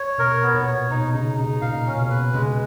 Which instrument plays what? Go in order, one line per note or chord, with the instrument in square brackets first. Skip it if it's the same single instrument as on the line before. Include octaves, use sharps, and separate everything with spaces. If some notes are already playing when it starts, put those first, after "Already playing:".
Already playing: [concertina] C#5
[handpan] B2 [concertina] A#4
[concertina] B3
[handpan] A#2
[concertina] C#5
[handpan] B2 [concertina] D#4
[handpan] C#3 [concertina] D#4
[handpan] C#3 [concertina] D#4
[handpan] A#2 [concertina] F5
[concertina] C#4
[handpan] B2
[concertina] B4
[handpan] C#3 [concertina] G#3